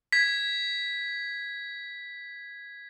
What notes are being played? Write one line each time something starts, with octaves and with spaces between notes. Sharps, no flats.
G#6 B6